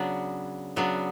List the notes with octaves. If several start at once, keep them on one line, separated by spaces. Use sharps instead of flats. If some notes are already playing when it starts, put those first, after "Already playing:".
Already playing: C#3 F#3 B3 D4
C#3 F#3 B3 D4